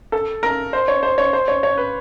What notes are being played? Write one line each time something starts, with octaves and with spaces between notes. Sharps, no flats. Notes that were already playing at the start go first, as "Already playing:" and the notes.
A4
A#4
C5
C#5
C5
C#5
C5
C#5
C#5
B4